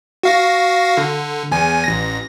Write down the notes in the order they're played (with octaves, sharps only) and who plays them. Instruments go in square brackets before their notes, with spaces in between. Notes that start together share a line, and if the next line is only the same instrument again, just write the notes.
[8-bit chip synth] F#4 F5 A#6
D3
E2 G#5
A1 A#6